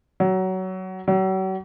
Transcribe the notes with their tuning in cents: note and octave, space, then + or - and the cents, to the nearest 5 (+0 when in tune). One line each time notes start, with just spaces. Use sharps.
F#3 +20
F#3 +40